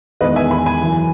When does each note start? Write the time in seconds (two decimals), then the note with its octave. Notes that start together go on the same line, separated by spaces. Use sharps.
0.21 E2 D#3 G#3 B4 D#5
0.36 E5 G#5
0.51 G#5 B5
0.66 G#5 B5
0.81 F#2 C#3 E3